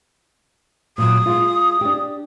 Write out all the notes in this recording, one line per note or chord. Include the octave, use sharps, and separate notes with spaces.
A#2 F#3 D#6
G#3 F4
D4 G4